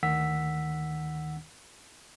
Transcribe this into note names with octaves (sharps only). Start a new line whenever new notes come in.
D2 D#3 F#5 E6 B6